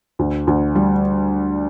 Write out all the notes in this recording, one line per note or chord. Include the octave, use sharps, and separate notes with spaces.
D2
D2
G3